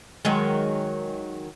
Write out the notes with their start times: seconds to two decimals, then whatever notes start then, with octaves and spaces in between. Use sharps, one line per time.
0.25 D#3 F#3 G#3